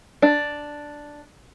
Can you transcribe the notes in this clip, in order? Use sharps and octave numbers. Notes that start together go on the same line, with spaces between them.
D4